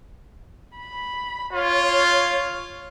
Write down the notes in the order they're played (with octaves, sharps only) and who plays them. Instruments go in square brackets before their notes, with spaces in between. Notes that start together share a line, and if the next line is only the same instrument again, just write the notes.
[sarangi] B5
[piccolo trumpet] F4 [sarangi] C#5